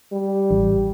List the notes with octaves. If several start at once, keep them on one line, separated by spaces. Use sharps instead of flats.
G3
A1